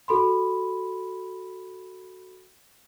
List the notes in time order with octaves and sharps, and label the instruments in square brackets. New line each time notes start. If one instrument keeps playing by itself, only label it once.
[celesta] F#4 A4 B5 C6